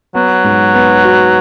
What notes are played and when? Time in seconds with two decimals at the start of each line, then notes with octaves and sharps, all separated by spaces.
0.15 F#3 B3
0.44 G#2
0.74 B3
1.03 F#4